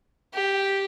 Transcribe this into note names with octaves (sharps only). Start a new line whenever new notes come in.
G4